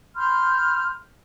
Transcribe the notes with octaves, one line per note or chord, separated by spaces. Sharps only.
B5 C6 F6 G6